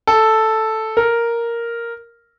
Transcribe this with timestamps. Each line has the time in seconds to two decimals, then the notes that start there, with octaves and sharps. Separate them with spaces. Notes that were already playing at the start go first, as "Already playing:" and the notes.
0.07 A4
0.97 A#4